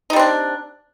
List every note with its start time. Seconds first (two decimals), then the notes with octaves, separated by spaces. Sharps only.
0.10 D#4
0.13 G3
0.16 C4
0.19 D4